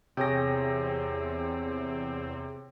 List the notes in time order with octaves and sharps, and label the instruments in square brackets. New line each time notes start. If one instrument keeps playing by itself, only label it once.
[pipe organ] E2 C4 [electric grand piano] C3 A#6 [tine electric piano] G#4 C#5 G5